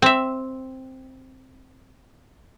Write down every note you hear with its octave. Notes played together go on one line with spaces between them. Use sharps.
C4 E5